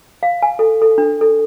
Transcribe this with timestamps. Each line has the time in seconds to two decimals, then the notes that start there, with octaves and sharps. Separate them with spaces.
0.23 F5
0.43 G#5
0.59 A4
0.82 A4
0.98 D4
1.21 A4